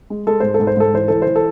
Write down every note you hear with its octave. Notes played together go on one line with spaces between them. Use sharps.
G#3
G#3 A4
G#2 C5
A4
G#2
C5
G#2 A4
E3 C5
E3 A4
E3 C5
A4